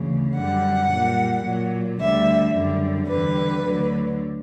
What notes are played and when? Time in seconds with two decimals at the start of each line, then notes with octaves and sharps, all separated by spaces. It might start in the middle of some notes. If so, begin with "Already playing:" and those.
Already playing: D2 C#3 E3
0.36 F#2 D3 G3 F#5
0.91 A#2 G3
1.45 A#2 F#3
1.99 D2 D3 G3 E5
2.53 F#2 D3 G3
3.08 E2 D3 G3 B4
3.62 D2 D3 F#3